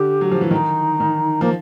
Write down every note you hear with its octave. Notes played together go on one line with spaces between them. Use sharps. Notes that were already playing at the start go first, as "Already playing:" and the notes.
Already playing: D3 G4
F#3
F3
E3
D#3 D#4
D#3
F3 A#3